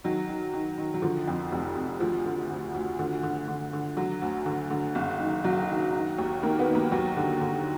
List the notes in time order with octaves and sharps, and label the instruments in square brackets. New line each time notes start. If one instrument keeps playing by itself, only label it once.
[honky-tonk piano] D#3 F#3
D#3
D#3
D#3
F#3
D3 F3
F2
F1
F1
D2 F3
D3
D2
D2
D3
D3
D3
D3
D3 F#3
D2
D3
D3
F#1
D#3
F#1 F#3
D#3
D#3
D#2
D#3 A#3
B3
D#3
A#3
D#2 F#3
D3
D3